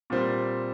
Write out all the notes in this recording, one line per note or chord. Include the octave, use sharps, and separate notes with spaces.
A#2 G3 C4